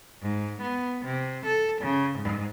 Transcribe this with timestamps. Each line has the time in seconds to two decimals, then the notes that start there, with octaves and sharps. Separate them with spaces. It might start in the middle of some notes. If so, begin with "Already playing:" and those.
0.22 G#2
0.61 B3
1.05 C3
1.46 A4
1.82 C#3
2.18 G#2